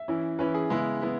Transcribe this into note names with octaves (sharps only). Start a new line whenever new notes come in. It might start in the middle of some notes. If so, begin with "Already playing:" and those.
Already playing: E5
E3 C#4 E4
E3 C#4 E4 B4
G#4
C#3 G#3 B3 E4
G#3 B3 E4